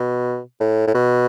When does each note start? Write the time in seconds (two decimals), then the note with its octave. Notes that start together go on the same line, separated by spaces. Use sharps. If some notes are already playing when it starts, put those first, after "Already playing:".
Already playing: B2
0.60 A2
0.87 A2
0.94 B2